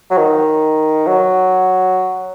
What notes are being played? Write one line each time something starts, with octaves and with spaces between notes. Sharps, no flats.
F#3
D#3
F#3